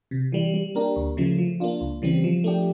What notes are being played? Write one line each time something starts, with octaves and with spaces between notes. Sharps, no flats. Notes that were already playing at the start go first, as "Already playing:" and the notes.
C3
E3 G3
G3
A#3 D4 G4 A#4
D2
C#3 F3 A3
F3
A#3 D4 F4
C#2
C#3 E3 G3 C4
F3
A3 D4 G4